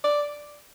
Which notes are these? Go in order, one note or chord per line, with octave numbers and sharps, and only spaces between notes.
D5